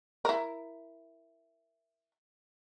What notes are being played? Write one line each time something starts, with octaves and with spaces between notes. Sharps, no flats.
E4 A#4